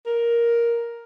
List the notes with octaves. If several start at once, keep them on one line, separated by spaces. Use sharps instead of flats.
A#4